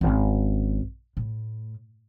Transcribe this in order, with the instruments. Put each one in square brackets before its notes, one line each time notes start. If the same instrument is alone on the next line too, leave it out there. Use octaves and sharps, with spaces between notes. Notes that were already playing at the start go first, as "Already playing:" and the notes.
[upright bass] G#1 C#4
A2